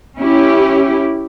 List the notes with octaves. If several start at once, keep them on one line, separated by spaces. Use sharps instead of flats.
C#4 E4 G4